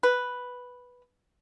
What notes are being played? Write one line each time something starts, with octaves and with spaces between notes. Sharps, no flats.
B4